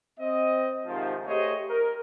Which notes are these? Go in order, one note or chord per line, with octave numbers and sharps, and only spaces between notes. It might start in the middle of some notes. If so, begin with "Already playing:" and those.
C4 D#5
G#2 C3 D#3 F3
A3 G4 G#4 C5 C#5 D#5
A#4